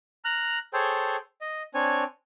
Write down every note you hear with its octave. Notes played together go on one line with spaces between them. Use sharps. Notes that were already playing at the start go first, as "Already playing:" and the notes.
A#5 F6 F#6
G#4 A4 C5 C#5 G5
D#5
C4 D4 C#5 G#5